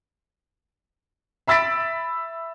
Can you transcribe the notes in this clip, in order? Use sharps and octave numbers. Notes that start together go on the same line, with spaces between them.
E5 B5 E6 A6 B6 D7